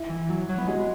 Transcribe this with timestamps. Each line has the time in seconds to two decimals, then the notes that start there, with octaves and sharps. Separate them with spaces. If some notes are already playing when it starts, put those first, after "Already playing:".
Already playing: E4
0.09 E3
0.30 F#3
0.49 F#3
0.58 B3
0.67 G#3 F#4